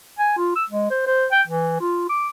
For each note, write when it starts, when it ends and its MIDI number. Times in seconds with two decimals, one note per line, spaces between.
0.19 0.37 80
0.38 0.51 65
0.56 0.65 88
0.70 0.89 56
0.91 1.04 72
1.07 1.26 72
1.32 1.42 79
1.48 1.78 52
1.80 2.08 65
2.09 2.28 86